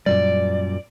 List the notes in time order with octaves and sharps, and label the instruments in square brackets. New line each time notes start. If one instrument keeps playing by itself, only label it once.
[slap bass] F#2 A#2 G3 [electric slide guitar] D5